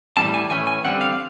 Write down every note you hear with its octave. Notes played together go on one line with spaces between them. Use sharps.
A2 E3 G3 C4 A5
G#5
A2 E3 A3 C#4 G#5
G#5
D3 G3 C4 F#5
F5